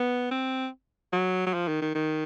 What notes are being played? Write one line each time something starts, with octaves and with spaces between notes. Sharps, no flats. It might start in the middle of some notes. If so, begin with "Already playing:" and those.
Already playing: B3
C4
F#3
F#3
F3
D#3
D#3
D#3